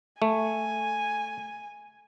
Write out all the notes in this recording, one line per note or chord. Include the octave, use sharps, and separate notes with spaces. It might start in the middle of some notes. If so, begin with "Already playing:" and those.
A3 G#5